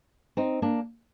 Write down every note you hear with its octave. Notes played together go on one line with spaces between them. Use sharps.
C4 D#4
A#3 D4